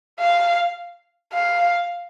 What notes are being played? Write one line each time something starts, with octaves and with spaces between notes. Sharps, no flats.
F5
F5